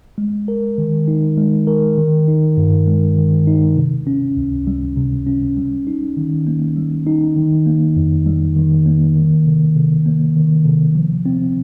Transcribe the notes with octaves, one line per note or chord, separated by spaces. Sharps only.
G#3
A#4
D#3
D#4
G#3
A#4
D#3
D#4
G2
G#3
D#3
D#4
C3
C#4
C#2
G3
C3
C#4
G3
D#4
D#3
A#3
G3
D#4
D#3
A#3
F2
G3
D#3
A#3
D#3
C3
C3
A#3
D#3
C3
F3
C4